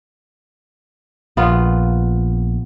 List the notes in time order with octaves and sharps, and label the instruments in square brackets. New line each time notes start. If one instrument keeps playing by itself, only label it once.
[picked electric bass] A#1 [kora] B3 F4